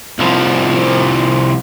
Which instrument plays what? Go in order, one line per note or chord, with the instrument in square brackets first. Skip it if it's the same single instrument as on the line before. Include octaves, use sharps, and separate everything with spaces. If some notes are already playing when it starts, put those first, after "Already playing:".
[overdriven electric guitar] C2 F3